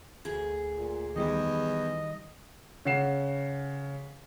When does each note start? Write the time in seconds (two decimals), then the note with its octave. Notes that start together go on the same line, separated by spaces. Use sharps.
0.25 D2 G#4
0.76 A#2
1.16 E2 D#3 G3 E4 D#5
2.85 C#3 C#4 F#5 C7 E7